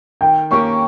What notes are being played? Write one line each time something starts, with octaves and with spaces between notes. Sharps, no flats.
D#3 G5
A#3 C#4 G4 A#4 C#6